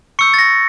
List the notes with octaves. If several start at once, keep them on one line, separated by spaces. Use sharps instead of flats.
C#6 E6 G6 C#7
A6
A#6